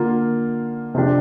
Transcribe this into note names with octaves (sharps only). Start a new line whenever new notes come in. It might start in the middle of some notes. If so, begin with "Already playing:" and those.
Already playing: D3 A#3 F4
C3 F3 D4 G4